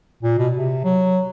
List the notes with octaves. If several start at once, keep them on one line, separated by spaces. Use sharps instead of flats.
A#2
B2
C3
F#3